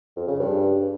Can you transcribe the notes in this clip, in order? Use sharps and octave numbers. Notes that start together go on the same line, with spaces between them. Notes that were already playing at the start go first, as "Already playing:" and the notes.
F2
C#3
G2